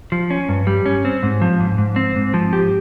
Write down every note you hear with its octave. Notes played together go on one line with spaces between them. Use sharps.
F3
C#4
G2
G3
C#4
C4
G#2
F3
G#2
G#2
C4
G#2
F3
G4